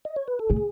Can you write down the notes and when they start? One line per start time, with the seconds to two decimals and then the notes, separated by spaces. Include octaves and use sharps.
0.05 D#5
0.16 C#5
0.28 B4
0.39 A4
0.49 A2 G#4